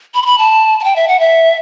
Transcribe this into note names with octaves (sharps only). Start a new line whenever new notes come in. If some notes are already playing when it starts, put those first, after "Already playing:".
B5
C6
B5
A5
A5
G5
E5
F#5
E5